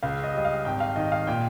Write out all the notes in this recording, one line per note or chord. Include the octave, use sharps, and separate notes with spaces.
C#2 F5
D#5
G3 D#5
F5
G#1 G5
F5
D#3 D#5
F5
A#2 G5